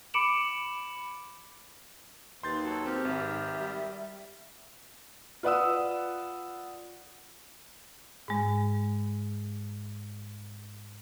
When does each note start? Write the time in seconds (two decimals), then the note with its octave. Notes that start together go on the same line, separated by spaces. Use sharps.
0.14 B5 D6 C#7 D7 E7 F#7
2.43 D#2 B4 C6 G6 A6
2.64 F#3 A4
2.86 C4 G4 A#4
3.05 G#1 E5
3.17 G#2
3.60 G3
5.43 F4 B4 D5 F#5 D#6 E6
8.28 G#2 G#3